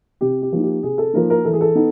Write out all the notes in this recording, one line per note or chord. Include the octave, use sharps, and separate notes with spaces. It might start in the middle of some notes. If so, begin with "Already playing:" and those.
C3 G4
G4
F3 A#3 D#4
G4
C3 G#4
A4
F3 A#3 D#4 A#4
A#4
E3 A4
G#4
A4
B3 D#4